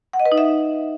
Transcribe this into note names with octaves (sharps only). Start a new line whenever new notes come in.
F#5
D#5
B4
D#4
E5